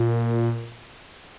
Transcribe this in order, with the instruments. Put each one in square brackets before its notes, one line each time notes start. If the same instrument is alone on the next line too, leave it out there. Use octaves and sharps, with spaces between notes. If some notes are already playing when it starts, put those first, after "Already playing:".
Already playing: [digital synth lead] A#2